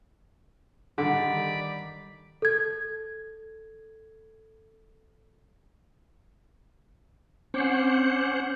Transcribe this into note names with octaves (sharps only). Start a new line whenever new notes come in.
D3 D#3 G3 D5 B5
A4 G#6
C4 C#4 C5 F#5 D6 C7